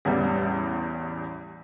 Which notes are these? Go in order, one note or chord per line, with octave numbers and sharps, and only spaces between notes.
A1 E2 G3